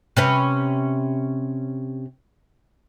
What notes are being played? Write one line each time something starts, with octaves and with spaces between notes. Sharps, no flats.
C3 C#4 B4